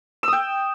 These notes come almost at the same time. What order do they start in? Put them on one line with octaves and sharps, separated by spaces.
E6 D#6 G5